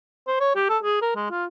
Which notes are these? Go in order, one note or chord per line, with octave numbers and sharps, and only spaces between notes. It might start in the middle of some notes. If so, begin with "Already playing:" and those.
C5
C#5
G4
A4
G#4
A#4
G#3
F4